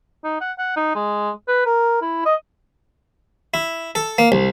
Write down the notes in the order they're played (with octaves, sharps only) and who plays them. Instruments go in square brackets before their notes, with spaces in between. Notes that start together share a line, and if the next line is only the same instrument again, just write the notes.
[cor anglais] D#4
F#5
F#5
D#4
G#3
B4
A#4
E4
D#5
[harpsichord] E4
A4
A#3
C2